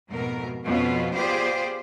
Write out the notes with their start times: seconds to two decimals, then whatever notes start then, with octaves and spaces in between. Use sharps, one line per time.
0.10 F2 G#2 B2 A3 A#4
0.64 F2 B2 F3 B3 C#4 F4
1.14 B3 F4 G4 G#4 C5 D5